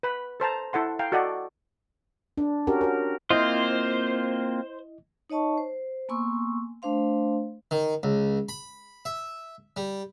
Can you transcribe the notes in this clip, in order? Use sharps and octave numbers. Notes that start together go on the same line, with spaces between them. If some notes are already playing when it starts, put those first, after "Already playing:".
B4 B5
A4 C5 A5 A#5
E4 A4 F#5 C6
F5 G5 A#5
F#4 A4 D5 D#5 F#5
D4
C#4 F#4 G4 A#4
F#4 A#4
A#3 C4 E4 F4 C5 D#5
D#4 C#5 D#5 A5 C#6
C5
A#3 B3 G#5 C6 C#6 E6
A3 D4 C5 F5 C6
D#3
C#2
B5
E5
G3